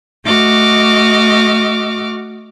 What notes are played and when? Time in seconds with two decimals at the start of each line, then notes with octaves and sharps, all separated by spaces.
0.23 A3 F#4 D#5 D6 F6